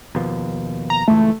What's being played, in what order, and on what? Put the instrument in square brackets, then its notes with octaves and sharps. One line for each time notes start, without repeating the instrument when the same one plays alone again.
[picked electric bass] D#2 B2 F3
[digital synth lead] A#5
[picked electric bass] F#1 C#2 E3 [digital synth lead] A3